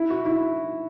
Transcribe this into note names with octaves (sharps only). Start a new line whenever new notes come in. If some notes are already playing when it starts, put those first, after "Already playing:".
Already playing: E4
F#4
E4